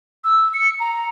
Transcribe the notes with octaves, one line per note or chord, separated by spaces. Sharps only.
E6
C#7
A#5